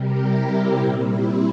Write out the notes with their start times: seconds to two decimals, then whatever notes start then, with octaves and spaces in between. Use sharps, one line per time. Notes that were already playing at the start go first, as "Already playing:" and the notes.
Already playing: C3 G3 G4 A#4
0.21 E4 G4
0.49 C4 E4
0.77 A#2 C4 E4
0.82 G3
1.05 C4 E4